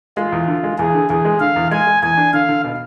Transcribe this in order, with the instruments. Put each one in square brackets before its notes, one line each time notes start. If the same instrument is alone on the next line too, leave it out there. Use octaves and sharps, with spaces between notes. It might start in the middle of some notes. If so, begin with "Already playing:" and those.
[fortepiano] G#3 [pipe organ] F4
[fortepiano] E2
D3
G#3
[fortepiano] E2 [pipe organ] G#4
[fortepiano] D3
[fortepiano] E2 [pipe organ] G#4
[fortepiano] G#3
[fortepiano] D3 [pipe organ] F5
[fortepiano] E2
[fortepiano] G#3 [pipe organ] G#5
[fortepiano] G#3
[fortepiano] E2 [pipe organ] G#5
[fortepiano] D4
[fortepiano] D3 [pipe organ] F5
[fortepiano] D3
B2